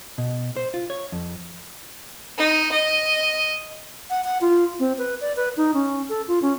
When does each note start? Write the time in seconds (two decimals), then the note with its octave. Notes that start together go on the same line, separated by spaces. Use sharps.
0.18 B2
0.56 C5
0.74 F4
0.90 C#5
1.12 F2
2.38 D#4
2.71 D#5
4.10 F#5
4.24 F#5
4.41 F4
4.80 C4
4.98 B4
5.21 D5
5.36 B4
5.57 D#4
5.74 C#4
6.09 A4
6.28 F4
6.42 C#4